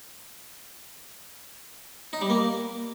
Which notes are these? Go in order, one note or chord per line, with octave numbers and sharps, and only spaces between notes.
D#4
G3
A#3